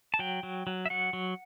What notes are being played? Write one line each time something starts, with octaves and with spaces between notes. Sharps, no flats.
A5
F#3 G5
F#3
F#3
E5
F#3 F#5
F#3